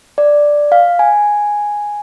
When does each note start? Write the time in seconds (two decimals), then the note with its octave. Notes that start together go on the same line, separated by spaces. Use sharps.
0.18 D5
0.72 F5
0.99 G#5